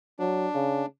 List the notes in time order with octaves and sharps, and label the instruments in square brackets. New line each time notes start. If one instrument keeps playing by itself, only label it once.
[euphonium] F#3 [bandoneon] D4
[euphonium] C#3